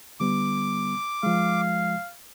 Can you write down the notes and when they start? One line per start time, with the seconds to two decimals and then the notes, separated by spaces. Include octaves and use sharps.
0.20 D3 G3 B3 D6
1.23 F3 G#3 F5